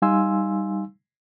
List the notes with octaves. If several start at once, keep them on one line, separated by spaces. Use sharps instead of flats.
G3 D#4 F5 G#5 C6 E6